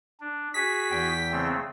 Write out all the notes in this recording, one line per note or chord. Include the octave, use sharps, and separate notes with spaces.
D4
F#4 G#4 B6
E2 G5
C#3 A3 C4